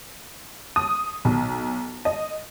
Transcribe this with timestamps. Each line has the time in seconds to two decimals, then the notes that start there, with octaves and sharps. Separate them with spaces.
0.76 D#6
1.25 B1
2.05 D#5